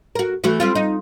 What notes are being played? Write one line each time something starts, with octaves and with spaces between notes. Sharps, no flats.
F#4 A#4
E3 A3 F#4
G3 C4 F4
D#4